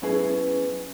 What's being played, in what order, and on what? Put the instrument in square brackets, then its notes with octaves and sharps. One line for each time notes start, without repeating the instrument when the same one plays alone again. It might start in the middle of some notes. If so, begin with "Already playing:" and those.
[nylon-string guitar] F#3 B3 C#4 E4 G#4 B4